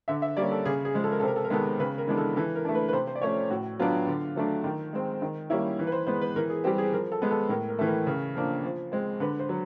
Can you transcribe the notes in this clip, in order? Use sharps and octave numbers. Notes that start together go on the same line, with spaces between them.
D3 E5
E5
G3 A#3 C#4 D5
A4
C#3 G#4
G#4
F3 G#3
A4
A#4
C3 A4
A#4
A4
A#4
D#3 G#3 B3 A4
C#3 B4
A#4
E3 G#3 B3 D4
A4
E3 A4
A#4
A3 D4
B4
B4
C3 C5
C5
D5
F3 A3 C#4 C#5
C5
A2 F#4
F#3 B3 D4 F4
D3
F#3 A3 D4
D#3
G#3 C4
D#3
G3 A#3 C#4 E4
E3
B4
C5
G#3 B3 C5
B4
E3 A#4
G#4
G3 C4 G4
G#4
F3 A#4
A4
G#3 B3
A4
A2 A#4
A#4
E3 A3
A#4
C#3
F3 A#3 D4
F3
G#3 C4
D3 B4
C5
F#3